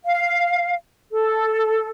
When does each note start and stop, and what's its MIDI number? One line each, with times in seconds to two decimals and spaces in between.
0.04 0.75 77
1.10 1.88 69